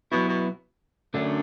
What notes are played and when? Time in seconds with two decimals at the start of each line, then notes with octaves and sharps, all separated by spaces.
0.12 B2 F#3 B3 E4
0.29 B2
1.14 F#2 D3 A3 D4